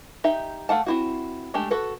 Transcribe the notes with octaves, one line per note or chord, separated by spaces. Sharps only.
D#4 G4 E5
A3 F5 F#5 A5
C4 E4 F#4
G#3 A3 D4 G4 A4
F#4 A4 B4